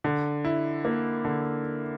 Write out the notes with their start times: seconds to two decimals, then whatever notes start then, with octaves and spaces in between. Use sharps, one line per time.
0.04 D3
0.45 E4
0.85 A#3
1.25 D3